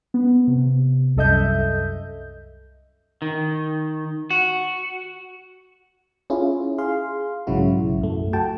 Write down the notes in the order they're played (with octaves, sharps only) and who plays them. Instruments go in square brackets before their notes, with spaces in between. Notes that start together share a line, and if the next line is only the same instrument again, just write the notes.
[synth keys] B3
C3
C2 F#2 A4 D#5 E5 G6
[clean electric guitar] D#3
F#4
[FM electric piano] C#4 E4 F4 G#4
G#4 F5 C6
B1 G#2 C#3 F#3 E4 F#4
F#2 A3
F#4 G5 A5